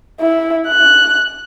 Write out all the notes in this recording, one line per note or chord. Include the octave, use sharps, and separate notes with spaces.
E4
F#6